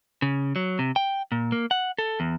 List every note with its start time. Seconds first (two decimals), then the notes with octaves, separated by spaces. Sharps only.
0.22 C#3
0.56 F#3
0.79 C3
0.96 G5
1.32 A#2
1.52 A#3
1.71 F#5
1.98 A4
2.20 E2